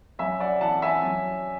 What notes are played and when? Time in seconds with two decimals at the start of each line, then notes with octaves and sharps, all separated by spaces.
0.19 F#2 E5 G#5
0.40 D5 F#5
0.61 E3 F#5 A5
0.82 E5 G#5
1.03 F#2